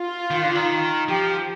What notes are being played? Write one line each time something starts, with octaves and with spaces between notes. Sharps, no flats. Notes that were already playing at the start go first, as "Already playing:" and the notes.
Already playing: F4
D#3
D3
D#3
F3 G4